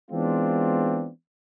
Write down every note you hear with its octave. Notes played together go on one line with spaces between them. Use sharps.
E3 G#3 B3 C4 D4 F4